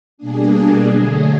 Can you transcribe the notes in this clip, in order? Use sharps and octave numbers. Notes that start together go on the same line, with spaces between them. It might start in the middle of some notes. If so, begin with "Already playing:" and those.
B2 G3 A#3 D4 G#4
D3 F#3 A3 G#4